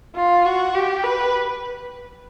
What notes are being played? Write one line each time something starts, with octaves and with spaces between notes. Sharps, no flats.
F4
F#4
G4
B4